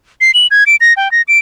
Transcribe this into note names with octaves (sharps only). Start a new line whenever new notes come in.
C7
F#7
G#6
D7
A#6
G5
A#6
D7